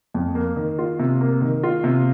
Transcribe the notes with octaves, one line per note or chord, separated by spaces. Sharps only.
F2
A#3
D#3
F4
C3
A#3
D#3
F4
C3